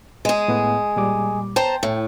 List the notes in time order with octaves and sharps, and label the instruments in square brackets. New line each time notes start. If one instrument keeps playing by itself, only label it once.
[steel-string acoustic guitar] G#3 G#4
[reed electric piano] A2 B3 F#5
A#2 G3 D6
[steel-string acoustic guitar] C5 A5 A#5 [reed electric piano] G5
[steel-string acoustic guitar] A2